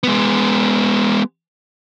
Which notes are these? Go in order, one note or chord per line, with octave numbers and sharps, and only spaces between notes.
G#3 B3